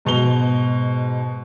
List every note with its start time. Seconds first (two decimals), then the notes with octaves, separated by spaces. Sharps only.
0.05 G#2 B2 F7 G7